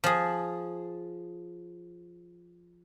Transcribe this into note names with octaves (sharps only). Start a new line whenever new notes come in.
F3 G#4